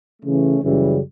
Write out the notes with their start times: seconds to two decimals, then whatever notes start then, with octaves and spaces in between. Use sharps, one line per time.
0.22 C#3 E3 A3 C#4
0.61 F#2 C#3 E3 G3